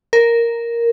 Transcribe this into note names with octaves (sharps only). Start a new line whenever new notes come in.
A#4